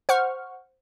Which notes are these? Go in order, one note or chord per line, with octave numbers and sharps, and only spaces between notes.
C5 F#5 C#6 F6